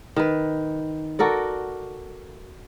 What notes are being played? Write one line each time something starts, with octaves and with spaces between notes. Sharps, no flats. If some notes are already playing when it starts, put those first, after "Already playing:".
D#3 B4
F#4 A4 A#4 D5